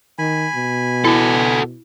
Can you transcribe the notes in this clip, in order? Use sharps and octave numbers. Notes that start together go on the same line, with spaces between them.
D#3 G#5 B5
B2
E4 F#4 A4